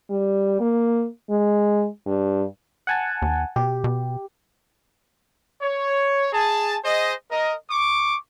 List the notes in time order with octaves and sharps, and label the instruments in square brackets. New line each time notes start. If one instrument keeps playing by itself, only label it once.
[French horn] G3
A#3
G#3
G2
[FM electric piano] F#5 G#5 A5
[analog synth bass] D#2
[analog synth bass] B2 [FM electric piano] G4
[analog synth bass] B2
[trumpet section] C#5
G#4 A5
G#4 C5 D#5
A#4 D#5
C#6 D6